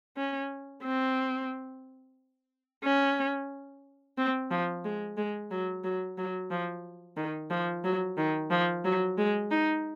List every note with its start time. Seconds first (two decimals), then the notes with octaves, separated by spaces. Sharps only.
0.17 C#4
0.84 C4
2.84 C#4
4.18 C4
4.51 F3
4.84 G#3
5.17 G#3
5.51 F#3
5.84 F#3
6.18 F#3
6.51 F3
7.17 D#3
7.50 F3
7.85 F#3
8.17 D#3
8.51 F3
8.85 F#3
9.18 G#3
9.51 D#4